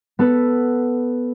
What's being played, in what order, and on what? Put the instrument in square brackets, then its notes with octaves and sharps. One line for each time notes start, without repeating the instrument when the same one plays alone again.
[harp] B3 A4 B4